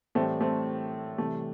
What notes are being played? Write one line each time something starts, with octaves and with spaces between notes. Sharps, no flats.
A2 E3 G3 A3 C4
A3 C4
C3 E3 G3 A3